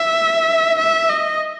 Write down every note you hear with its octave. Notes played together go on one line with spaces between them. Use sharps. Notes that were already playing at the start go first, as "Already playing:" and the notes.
Already playing: E5
E5
D#5